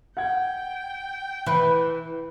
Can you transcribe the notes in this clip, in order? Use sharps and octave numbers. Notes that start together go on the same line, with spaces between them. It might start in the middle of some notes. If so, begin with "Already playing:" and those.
F#5 G5 G#6
E3 B4 B5